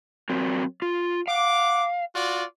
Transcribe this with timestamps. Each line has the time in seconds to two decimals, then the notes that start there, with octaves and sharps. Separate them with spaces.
0.29 F#3 C4 A#4
0.82 F4
1.28 F5 F#5 D6
2.15 F4 F#4 D5